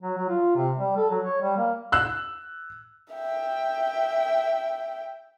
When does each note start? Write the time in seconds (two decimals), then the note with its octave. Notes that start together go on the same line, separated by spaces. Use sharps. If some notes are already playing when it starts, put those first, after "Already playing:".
0.02 F#3
0.17 F#3
0.29 F4
0.55 C3
0.78 G3
0.97 A4
1.10 F#3
1.24 C#5
1.41 G3
1.57 A#3
1.92 E6 F#6
3.13 E5 G5